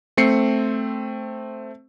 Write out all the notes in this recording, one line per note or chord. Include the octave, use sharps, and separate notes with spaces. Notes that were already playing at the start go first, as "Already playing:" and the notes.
A3 C4 C7 C#7